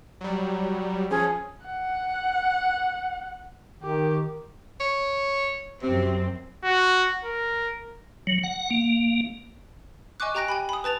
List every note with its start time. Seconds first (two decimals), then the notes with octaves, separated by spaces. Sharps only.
0.21 F#3 G3
1.11 F3 C#4 G#4
1.66 F#5
3.83 D#3 G4
4.80 C#5
5.83 F#2 C3 C4
6.64 F#4
7.25 A#4
8.27 F#3
8.44 F#5
8.70 A#3
10.20 D#5 G#5 C#6 D6 F#6
10.35 G4 G5 A#5 F#6 A#6 D7
10.48 G5 G#5 B5
10.69 B5 D#6
10.84 B4 A5 A6 F7